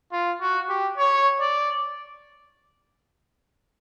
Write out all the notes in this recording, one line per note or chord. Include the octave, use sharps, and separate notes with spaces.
F4
F#4
G4
C#5
D5